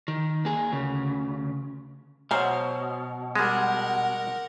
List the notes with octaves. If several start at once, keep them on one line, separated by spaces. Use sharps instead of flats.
D#3
A#3 G#4
D2 C#3
B2 F#3 C5 F5
G3 G#3 A#4 F#5